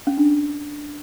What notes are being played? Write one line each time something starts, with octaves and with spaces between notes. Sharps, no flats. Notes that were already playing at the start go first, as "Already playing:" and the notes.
C#4
D4